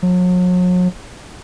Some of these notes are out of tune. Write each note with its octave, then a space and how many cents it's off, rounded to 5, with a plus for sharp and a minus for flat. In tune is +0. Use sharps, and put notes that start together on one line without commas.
F#3 -40